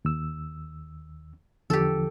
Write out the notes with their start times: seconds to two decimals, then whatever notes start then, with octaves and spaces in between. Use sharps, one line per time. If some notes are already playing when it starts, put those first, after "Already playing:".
0.05 D#2 E6
1.70 E2 D3 F3 G4 A4